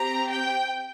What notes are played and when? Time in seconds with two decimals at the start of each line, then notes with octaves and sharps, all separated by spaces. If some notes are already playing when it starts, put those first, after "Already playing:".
Already playing: C4 G4 A#5
0.31 G5